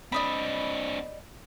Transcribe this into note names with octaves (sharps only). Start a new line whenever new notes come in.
C4 D4 D5 D#5 B5